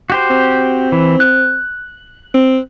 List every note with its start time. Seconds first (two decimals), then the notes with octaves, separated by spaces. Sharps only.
0.10 F#4 G4 C5
0.30 C4
0.92 E3
1.20 F#6
2.34 C4